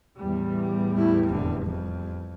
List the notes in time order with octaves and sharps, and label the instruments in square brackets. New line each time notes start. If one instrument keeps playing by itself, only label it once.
[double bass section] E2 A2 G3
[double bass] A3 E4
F1 D3
F2